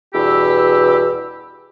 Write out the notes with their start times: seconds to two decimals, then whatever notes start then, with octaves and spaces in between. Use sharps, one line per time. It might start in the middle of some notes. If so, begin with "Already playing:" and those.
0.14 E2 G2 B2 G4 B5 E6